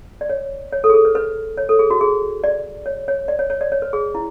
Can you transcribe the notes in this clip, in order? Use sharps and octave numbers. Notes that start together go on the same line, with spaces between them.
D5
C#5
C#5
A4
G#4
A4
B4
B4
C#5
A4
G#4
F#4
G#4
D5
C#5
C#5
D5
C#5
C#5
D5
C#5
B4
G#4
E4